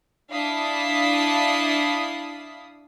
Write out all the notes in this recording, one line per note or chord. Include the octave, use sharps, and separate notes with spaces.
D4 E4 F5 A5 D#6 B6